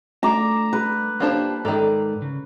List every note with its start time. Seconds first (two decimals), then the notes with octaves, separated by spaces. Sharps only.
0.23 A3 D4 F4 A#5 D6
0.73 B4
1.20 A#3 D4 F4 G4 C5 A5
1.65 G#2 D#3 A4 D5 A#5
2.22 C#3